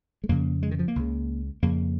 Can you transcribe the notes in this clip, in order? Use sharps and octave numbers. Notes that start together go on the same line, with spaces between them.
G#3
F2 C#3 A#3
G#3
D#3
F3
A#3
C#2 C#3
F2 C#3 A#3